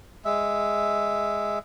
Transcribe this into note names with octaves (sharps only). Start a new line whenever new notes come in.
G#3 E5